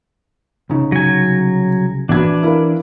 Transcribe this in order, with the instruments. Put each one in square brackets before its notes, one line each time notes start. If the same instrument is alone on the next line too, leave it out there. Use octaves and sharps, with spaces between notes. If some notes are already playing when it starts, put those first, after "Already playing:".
[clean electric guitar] C2 C#3 [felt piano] C#4 D#4
[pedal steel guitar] F#3 G#5
[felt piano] A#1 F#4 G#6 [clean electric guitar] E3 C4 B4 [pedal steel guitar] D4
[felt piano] E4 A#4 F5